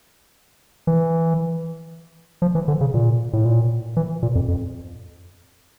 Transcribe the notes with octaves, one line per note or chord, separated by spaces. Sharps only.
E3
F3
E3
D3
C#3
A#2
A2
A#2
E3
A#2
F2
F2